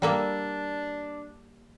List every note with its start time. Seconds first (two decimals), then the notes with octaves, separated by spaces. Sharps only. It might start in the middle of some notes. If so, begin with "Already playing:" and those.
0.02 G3 A#3 D4 E5